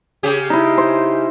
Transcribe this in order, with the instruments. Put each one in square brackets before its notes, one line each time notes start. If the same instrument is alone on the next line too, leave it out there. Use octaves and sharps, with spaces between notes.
[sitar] C#3 G4
[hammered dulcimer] D#4 E4
C5